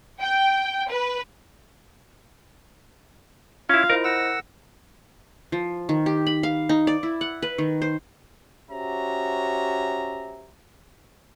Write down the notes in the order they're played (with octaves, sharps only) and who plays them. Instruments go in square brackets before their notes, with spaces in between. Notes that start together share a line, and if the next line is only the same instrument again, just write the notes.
[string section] G5
B4
[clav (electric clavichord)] C#4 E4 [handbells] F4 [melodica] F5
[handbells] E4 C5 D#5 [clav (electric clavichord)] A#4
[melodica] F#5 E6 [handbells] A#6
[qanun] F3
D#3
G4
B5
F5
D#4
D5
E4
F#5
B4
D#3
C5
[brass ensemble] C#4 F#4 G4 C5 E5 A#5